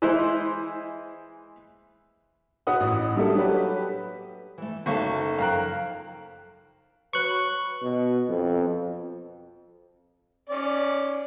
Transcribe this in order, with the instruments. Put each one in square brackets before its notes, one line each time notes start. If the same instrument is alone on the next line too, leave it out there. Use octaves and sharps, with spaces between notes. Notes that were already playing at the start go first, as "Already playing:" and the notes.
[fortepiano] E3 G#3 E4 C5
[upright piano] F#4 B4 F#5 D#6
A1
F#3 G3 A#3 D4 A4 E5
F#3 F#4 G4 A4 B4
[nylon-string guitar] E3 A3
[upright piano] F#1 C#6 [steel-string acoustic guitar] D#2 A4 [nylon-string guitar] F#4 E5 F5
[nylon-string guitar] F#2 F3 G5 [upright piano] F5 A#5 F#6
[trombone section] F#3 B4 [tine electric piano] C#6 F#6
[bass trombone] B2
F2
[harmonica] C#4 D5